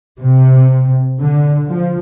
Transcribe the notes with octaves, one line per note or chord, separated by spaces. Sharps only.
C3
D3
F3